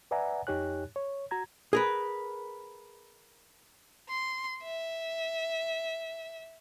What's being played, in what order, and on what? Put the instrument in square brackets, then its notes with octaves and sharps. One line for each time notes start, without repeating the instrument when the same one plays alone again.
[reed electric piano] B4 D5 E5 F#5 G#5 A#5
F2 D#4 G4 C#5 G#5 F#6
C#5
F#4 A#5 G#6
[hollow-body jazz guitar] G#4 A#4 B4
[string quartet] C6
E5